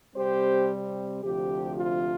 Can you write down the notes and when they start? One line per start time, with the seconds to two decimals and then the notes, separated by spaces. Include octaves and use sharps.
0.16 C3 G3 C4 G4 C5
1.23 D2 C3 F3 G4
1.76 F4